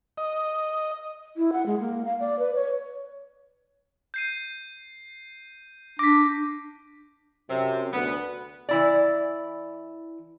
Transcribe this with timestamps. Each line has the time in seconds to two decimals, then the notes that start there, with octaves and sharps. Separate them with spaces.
0.18 D#5
1.37 E4
1.53 F#5
1.66 G#3
1.80 A#3
2.05 F5
2.20 D5
2.39 B4
2.55 C#5
4.14 G6 C7 D#7
5.99 D4 D6 A#6 B6
7.49 F#2 C3
7.92 D2 B3
8.69 E3 E4 D5